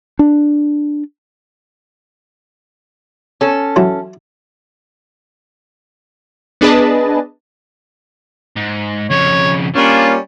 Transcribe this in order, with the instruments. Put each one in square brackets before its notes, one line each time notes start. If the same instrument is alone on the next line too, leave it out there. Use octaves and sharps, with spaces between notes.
[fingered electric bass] D4
[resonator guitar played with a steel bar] C#4 A4
[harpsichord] E3 F#3 E4
[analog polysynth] B3 D4 G#4 B4 D#5 A5
[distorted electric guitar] G#2
[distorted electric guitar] F2 C#3 [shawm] C#5
[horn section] G3 A#3 C#4 [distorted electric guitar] D4 [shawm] F4